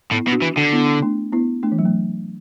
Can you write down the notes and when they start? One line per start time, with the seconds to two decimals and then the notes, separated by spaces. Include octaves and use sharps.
0.11 A2 B3 E4
0.27 B2
0.32 D4 F#4
0.42 E3
0.57 D3
0.72 B3 E4
1.02 A3 D4
1.33 B3 E4
1.63 A3 D4
1.72 E3
1.79 F#3
1.85 A3